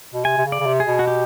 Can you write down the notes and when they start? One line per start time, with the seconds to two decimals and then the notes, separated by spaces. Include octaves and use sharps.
0.14 B2
0.25 C3 G#5
0.38 C3
0.46 C#3
0.52 D5
0.60 C#3
0.66 C3
0.80 G#4
0.87 B2
0.99 F#4
1.08 G4